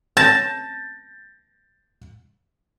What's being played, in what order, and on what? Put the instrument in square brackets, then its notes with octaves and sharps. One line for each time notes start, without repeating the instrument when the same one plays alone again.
[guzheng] A5 [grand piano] G6 A6 A#6